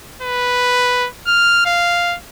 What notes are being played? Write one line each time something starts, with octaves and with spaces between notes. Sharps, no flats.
B4
F6
F5